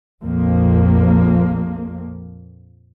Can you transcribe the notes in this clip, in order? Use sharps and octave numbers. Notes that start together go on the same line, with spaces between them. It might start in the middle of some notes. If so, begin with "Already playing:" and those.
A#1 F2 F3 A#3